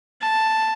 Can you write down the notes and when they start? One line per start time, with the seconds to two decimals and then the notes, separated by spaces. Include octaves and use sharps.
0.21 A5